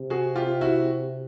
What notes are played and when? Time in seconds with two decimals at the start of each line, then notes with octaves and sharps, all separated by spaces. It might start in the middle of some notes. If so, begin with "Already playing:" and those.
Already playing: C3
0.10 F#4 G#4
0.36 F4 G4
0.61 E4 F#4